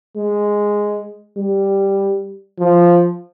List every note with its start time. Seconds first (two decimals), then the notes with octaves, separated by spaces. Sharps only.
0.17 G#3
1.37 G3
2.59 F3